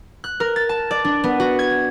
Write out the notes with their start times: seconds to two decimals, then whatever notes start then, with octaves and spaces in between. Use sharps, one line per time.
0.24 F#6
0.40 A#4
0.56 A6
0.69 A5
0.91 D5
1.05 D4
1.24 B3
1.40 F#4
1.59 G#6